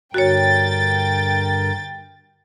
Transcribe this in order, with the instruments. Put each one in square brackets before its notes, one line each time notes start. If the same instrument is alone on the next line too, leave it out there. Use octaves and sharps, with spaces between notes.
[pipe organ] G2 D3 A#4 [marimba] F#4 C#5 [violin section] G5 A6